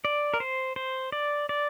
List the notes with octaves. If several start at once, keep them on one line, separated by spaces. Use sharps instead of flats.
D5
A#4
C5
C5
D5
D5